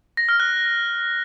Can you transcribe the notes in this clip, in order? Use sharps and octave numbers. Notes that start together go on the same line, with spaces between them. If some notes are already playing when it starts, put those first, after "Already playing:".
A#6
F6
F#6